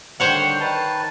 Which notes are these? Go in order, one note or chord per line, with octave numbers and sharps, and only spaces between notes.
D3 D#3 G3 C5 C#5 F#5
D#3 B4 A5